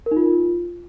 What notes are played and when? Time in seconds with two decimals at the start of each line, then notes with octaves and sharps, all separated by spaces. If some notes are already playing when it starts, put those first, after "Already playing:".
0.06 A#4
0.11 D#4
0.17 F4